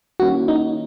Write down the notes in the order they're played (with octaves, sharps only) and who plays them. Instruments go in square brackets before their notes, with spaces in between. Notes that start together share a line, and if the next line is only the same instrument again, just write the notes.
[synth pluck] D#3 G3 A#3 C#4 E4 [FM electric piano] F#4
[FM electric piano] D#4